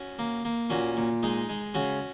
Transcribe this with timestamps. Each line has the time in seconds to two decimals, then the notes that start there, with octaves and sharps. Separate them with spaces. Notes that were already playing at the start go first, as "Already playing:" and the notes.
Already playing: C#4 F#4
0.19 A#3
0.45 A#3
0.70 A#2 C#4 F#4
0.97 A#2
1.23 G#3 D#4
1.49 G#3
1.74 C#3 C#4 F#4